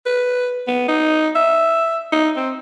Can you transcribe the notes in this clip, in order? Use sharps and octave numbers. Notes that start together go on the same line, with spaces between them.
B4
B3
D#4
E5
D#4
C4